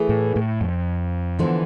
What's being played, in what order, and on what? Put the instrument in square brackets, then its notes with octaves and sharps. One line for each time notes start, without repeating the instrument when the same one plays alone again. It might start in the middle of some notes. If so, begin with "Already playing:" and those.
Already playing: [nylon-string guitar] E3 A3 E4 G#4
[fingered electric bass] A2
A2
F2
[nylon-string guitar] D3 F3 B3 [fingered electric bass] E3